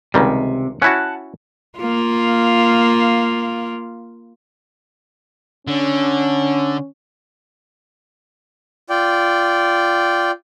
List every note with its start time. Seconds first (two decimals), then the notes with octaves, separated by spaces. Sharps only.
0.14 C#2 C3 D#3 G3
0.82 C#4 E4 F#4 F#5 A5
1.79 A#3 F4
5.67 D3 C#4
8.90 F4 D5 G5